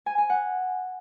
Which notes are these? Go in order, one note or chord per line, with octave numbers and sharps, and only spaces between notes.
G#5
G#5
F#5